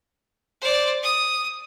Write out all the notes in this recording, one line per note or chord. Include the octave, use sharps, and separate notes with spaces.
C5 D5
D#6